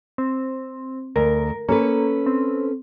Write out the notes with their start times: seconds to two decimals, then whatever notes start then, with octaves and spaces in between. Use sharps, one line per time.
0.18 C4
1.16 D2 A#4
1.68 A#3 C#4 A4 B4
2.26 C4